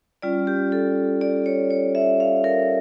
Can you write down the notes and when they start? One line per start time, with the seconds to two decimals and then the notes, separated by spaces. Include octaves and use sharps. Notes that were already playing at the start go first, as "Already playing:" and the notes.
0.22 G3 C#4 F4 D5
0.47 G4
0.72 A4
1.21 D5
1.46 C#5
1.71 C#5
1.95 E5
2.20 F5
2.44 A#4